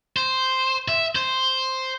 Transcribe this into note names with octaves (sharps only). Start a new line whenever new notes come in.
C5
E5
C5